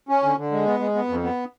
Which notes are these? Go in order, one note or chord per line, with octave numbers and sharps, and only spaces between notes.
C#4
D3
D3
G#3
B3
G#3
B3
F2
B3